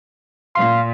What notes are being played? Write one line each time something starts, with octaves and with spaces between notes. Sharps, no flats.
A#2 F5 C6